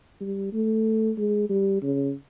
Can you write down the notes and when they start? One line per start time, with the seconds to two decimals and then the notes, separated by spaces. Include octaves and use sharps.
0.21 G3
0.53 A3
1.18 G#3
1.50 G3
1.82 C#3